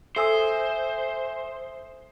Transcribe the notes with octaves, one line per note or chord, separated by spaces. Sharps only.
A4 C5 E5 G#5 D#6 E6